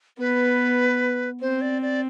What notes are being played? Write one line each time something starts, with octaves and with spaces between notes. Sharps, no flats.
B3 B4
C4 C5
D5
D5